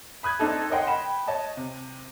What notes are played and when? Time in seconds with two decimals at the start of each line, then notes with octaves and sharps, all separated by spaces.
0.23 B5 D#6 F#6 G#6
0.39 C4 D4 D#4 A4
0.70 A#4 C#5 D#5 F#5 G5 C6
0.87 G5 B5 E7
1.27 C#5 D#5 A5
1.57 C3